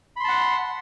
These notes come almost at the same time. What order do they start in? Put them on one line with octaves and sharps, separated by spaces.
B5 C6 A5 F#5